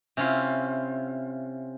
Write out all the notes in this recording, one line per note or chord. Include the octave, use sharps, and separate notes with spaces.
C3 C#4 E4 F4